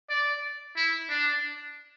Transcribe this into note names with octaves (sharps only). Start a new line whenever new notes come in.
D5
E4
D4